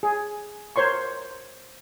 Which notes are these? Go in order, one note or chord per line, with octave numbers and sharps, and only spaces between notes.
G#4
A#4 C5 C#5 C6 C#6